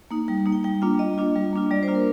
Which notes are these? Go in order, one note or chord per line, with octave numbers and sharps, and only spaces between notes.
A#3 D#4
G3 G5
A#3 D#4
G5
G3 G5
A#3 D4 F4 G5
G3 D#5
A#3 D4 F4
G3
A#3 D4 F4
G3 D5
C5
A#3 D4 F4
A#4